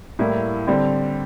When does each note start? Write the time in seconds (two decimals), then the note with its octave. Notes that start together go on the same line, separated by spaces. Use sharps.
0.19 A2 G3 A#3 E4
0.67 D3 G3 C4